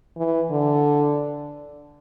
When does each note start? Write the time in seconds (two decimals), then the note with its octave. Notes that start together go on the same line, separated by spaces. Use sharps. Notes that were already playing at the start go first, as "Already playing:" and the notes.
0.17 E3
0.50 D3